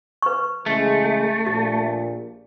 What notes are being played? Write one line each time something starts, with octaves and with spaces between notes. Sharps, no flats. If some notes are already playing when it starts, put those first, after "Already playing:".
B4 C#6
C#3 E3 G#3 A3
A#1 A#2 G4